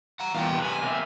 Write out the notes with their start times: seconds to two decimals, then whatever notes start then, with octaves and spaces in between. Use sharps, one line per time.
0.20 F#5 A#5
0.35 E2 A#2 F5 G5
0.51 C3 B4
0.64 G#5
0.82 A#3 C4 E5